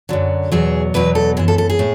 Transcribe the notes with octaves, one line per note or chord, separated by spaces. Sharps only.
F#2 D3 F#3
E2 B2 F#3 G#4
E2 B2 F#3 B4
A4
F#2 E3 G#4
A4
A4
G#4
A2